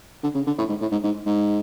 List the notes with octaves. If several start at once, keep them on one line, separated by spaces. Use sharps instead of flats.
D3
C#3
D3
A2
G#2
A2
G#2
G#2
G#2